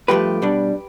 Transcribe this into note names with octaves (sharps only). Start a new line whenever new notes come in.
G2 F3 A3 G4 B4
B2 G3 D4